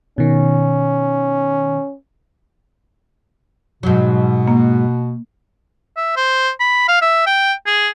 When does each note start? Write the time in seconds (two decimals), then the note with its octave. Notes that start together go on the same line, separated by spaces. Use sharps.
0.18 B2 D#3 C#4
3.83 G#2 B2 F#3
4.48 A#3
5.97 E5
6.16 C5
6.60 B5
6.88 F5
7.02 E5
7.27 G5
7.66 G#4